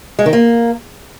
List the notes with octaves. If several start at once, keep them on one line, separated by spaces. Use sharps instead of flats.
G#3
D#3
A#3